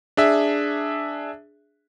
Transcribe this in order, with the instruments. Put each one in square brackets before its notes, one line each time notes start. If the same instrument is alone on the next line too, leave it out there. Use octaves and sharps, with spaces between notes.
[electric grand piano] D4 G#4 E5